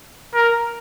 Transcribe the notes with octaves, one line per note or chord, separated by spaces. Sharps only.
A#4